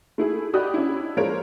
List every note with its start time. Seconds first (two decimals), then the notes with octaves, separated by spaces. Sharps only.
0.18 A3 E4 G#4
0.53 F#4 G4 D5 D#5 B5 D#6
0.74 C#4 D4 E4
1.17 F3 G#3 A#4 C5 C#5 D7